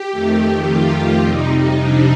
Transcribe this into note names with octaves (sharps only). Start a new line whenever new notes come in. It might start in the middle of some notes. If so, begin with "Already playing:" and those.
Already playing: G4
F2 D#3 A3
F4
F2 C3 G3 D#4
D4